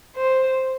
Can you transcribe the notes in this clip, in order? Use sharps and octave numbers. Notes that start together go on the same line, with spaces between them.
C5